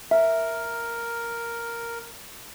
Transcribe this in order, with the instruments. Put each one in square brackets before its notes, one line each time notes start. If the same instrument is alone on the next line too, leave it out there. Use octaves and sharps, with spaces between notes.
[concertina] A#4 [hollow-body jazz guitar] E5